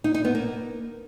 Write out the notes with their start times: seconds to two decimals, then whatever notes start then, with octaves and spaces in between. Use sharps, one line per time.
0.04 D#4
0.14 D#4
0.25 B3
0.35 A#3